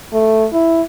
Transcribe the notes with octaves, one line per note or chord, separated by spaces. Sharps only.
A3
E4